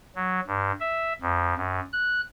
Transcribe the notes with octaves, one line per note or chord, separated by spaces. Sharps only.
F#3
G2
E5
F2
F#2
F#6